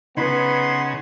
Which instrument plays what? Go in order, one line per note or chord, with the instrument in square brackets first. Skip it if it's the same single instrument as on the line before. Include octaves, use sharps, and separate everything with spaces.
[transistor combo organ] C#3 [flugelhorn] B3 [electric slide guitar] D#4 B4 [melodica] B5 C6